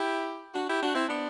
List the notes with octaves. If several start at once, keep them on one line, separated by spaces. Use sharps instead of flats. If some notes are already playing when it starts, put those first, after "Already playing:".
Already playing: E4 G4
D4 F#4
E4 G4
D4 F#4
C4 E4
B3 D4